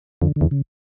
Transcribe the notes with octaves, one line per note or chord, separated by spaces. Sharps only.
F2 D3
D3
E2
C#3